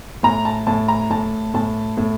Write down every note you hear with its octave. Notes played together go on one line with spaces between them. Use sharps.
A2 A#5
A5
A2 A5
A#5
A2 A5
A2 A5
A2